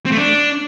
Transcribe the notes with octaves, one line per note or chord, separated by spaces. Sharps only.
C4
A3
D4